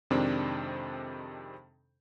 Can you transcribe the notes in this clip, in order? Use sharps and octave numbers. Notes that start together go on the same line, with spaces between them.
F2 C3 D#3 G#3 C4 D4